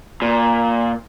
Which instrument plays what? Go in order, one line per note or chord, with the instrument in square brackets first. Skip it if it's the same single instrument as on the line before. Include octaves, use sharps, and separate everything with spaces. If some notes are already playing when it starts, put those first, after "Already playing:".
[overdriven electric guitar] A#2